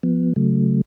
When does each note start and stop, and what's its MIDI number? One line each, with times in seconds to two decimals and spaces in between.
0.03 0.33 53
0.03 0.33 59
0.36 0.81 49
0.36 0.81 54
0.36 0.81 57